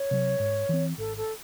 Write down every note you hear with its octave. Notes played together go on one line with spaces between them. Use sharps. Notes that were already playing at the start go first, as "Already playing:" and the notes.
Already playing: C#5
C3 F#3 C4
G#2
E3 C4
G#1 A4
A4